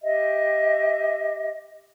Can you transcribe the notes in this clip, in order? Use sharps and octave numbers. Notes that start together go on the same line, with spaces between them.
G4 D#5 E5